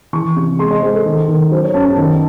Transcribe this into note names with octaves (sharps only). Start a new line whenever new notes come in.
E3 C#6
C3
G#3 C6
D#5
G#3 C5
A4
D#3
D#3
F#3 C5
C#5
F#2 A5
A5
D#3